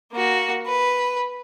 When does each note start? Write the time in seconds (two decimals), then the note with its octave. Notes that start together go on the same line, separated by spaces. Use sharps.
0.13 A#3 F#4
0.66 B4